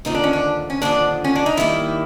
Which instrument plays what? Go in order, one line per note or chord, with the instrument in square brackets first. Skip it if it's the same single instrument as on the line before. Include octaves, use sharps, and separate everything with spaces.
[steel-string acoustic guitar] D#2 D3 F3 [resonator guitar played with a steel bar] D#4
[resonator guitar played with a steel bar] D4
C#4
D4
C#4
[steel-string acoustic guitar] D#2 D3 F3 [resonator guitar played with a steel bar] D4
[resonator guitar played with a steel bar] C#4
D4
D#4
[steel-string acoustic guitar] D#3 G3 A#3 [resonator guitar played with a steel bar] E4